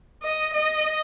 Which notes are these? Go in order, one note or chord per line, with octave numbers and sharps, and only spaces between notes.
D#5
D#5